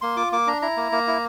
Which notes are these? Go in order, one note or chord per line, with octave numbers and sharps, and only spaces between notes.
A#3 C6
F4 D6
A#3 D6
D4 A#5
E4 A#5
A#3
A#3
E4